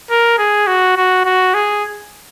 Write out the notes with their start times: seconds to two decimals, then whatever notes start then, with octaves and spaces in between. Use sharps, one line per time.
0.10 A#4
0.38 G#4
0.67 F#4
0.96 F#4
1.25 F#4
1.54 G#4